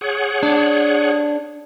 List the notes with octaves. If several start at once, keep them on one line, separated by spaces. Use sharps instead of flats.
G#4 C#5 F#5
D4